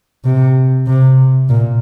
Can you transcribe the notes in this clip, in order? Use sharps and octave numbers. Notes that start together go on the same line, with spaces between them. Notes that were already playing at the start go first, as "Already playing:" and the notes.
C3
C3
A#2